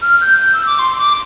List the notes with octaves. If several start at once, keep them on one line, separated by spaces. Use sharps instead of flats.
F6
G6
G6
E6
D6
C6
D6